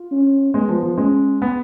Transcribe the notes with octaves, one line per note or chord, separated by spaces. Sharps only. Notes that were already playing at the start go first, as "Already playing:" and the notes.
Already playing: F4
C#4
G#3 B3
F3
F3
G#3 C#4
B3